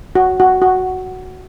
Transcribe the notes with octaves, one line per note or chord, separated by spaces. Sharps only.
F#4
F#4
F#4